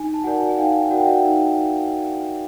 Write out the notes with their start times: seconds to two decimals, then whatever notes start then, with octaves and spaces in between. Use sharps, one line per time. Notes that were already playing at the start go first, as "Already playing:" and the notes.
Already playing: D#4 G#5
0.14 A5
0.24 F#4 A#4 D5 F#5 G#5
0.49 G#5
0.57 D#4 F5 G5
0.90 F#4 A#4 D5 F#5
0.98 G5
1.06 E5 F#5
1.24 D#4